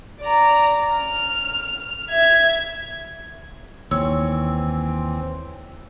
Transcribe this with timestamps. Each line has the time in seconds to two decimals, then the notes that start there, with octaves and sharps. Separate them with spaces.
0.21 D5 A#5
0.94 F6
2.09 E5 G#6
3.91 D#2 E3 C4 C#5 E6